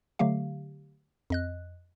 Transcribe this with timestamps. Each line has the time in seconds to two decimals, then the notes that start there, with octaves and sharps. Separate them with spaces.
0.19 D3 F#3 A3 G4 F5
1.30 F2 D#5 F#6